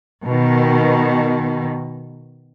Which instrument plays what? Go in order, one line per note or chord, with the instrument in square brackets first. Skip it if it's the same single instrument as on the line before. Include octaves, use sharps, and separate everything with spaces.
[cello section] B2 D#3